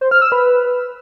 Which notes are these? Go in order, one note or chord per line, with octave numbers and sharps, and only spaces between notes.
C5
F6
E6
B4